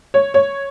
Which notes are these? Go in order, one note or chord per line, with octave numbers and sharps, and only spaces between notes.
C#5
C#5